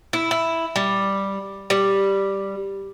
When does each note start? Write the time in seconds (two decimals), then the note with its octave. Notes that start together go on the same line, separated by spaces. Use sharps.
0.13 E4
0.31 E4
0.76 G3
1.70 G3